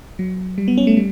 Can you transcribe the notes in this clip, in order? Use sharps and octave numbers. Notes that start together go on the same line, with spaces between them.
F#3
G3
B3
C#4
A3
G3